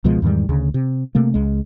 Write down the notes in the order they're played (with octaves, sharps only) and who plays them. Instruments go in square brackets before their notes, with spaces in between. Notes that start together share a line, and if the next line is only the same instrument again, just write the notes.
[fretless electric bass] C#2 B2 F3 G#3
E2 G#2 D#3 G3
D2 C#3
C3
C3 A3 A#3
C#2 G#3